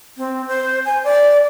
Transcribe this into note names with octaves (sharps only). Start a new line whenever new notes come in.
C4
C5
G#5
D5